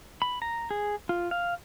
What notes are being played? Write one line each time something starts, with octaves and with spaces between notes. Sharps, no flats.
B5
A#5
G#4
F4
F5